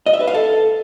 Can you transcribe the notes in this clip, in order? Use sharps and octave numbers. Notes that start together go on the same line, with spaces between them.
D#5
E5
B4
F5
A4